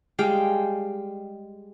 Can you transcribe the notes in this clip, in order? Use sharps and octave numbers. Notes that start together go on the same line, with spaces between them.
G3 G#3 F5 G5